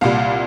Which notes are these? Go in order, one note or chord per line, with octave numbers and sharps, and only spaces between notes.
C2 A#2 G3 F5